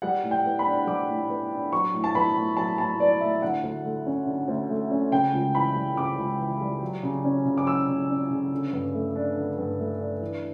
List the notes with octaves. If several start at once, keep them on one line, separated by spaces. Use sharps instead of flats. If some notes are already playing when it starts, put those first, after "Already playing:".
G3 F#5
A2
G5
B3
B5
D4
G3 D6
A2
B3
D4
F#3 C#6
A2
A5
B3 B5
A2
F#3 A5
A2 A5
B3 D5
A2 E5
D3 F#5
D2
A3
C#4
D3
D2
A3
C#4
C#3 G5
C#2
E3 B5
G3
C#3 D6
C#2
E3
G3
F#3
C#3
C#4
C#3
D6
F#3 E6
C#3
C#4
C#3
D3
G2
A3
D4
D3
G2
A3
D4
E3